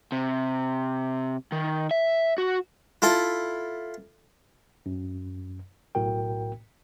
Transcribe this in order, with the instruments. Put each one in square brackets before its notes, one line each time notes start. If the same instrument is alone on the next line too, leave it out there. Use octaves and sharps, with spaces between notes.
[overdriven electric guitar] C3
D#3
E5
F#4
[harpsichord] E4 F4 A4
[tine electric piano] F#2
B1 A2 F#4 A#4 G5